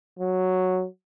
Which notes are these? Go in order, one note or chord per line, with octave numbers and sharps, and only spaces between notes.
F#3